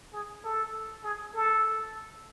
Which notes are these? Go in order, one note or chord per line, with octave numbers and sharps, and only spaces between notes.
G#4
A4
G#4
A4